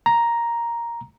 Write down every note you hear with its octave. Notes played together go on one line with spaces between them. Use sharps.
A#5